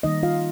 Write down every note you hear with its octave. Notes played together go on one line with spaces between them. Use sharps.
D#3 G3 A#3 D#4 D#5
F4 F5